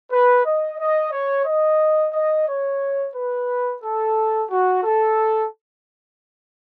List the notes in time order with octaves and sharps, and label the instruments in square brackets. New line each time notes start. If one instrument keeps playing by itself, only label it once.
[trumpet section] B4
D#5
D#5
C#5
D#5
D#5
C#5
B4
A4
F#4
A4